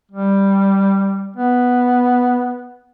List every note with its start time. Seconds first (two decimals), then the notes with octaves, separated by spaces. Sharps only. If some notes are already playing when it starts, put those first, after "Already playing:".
0.12 G3
1.37 B3